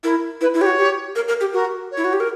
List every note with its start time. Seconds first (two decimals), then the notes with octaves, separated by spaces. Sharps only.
0.04 E4 A#4
0.41 E4 B4
0.54 E4
0.59 G4 C#5
0.66 F#4
0.78 G4
1.16 A#4
1.28 A#4
1.41 G4
1.53 F#4 A#4
1.91 C#5
1.97 E4
2.04 F#4
2.13 G4
2.20 A#4